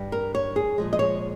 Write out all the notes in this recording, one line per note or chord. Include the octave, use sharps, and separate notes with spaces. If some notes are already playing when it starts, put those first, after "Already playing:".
Already playing: G2 G3
A#4
C#5
G#4
A#2 F3 G#3
D#5
C#5